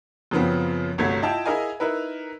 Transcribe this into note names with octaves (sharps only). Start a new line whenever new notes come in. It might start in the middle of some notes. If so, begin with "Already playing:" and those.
F#2 C#3 F3 B3 C4
G1 C2 F#3 A3 G#6
E4 F4 D#5 G5 A5
E4 G#4 A#4 D#5 F5 G#5
D#4 E4 A#4 B4